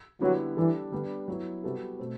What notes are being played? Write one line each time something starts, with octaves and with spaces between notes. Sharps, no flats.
D3 F#3 G3 B3 E4
E3 G3 D4 A4
D3 G3 B3 D4
F#3 B3 E4
C3 G3 B3 F#4 A4
B2 A3 C4